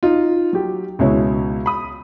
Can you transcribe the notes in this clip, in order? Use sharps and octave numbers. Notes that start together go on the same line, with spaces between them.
D#4 F4
F#3 G4
C#2 B2 G#3 E4 C#5
B5 D#6